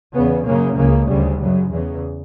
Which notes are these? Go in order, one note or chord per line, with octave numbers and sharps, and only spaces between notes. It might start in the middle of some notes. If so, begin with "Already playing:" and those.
E2 C#3 B3
F#2 C#3 A#3
C#2 C#3 A#3
D2 C#3 G3
F#2 C#3
E2 C#3 E3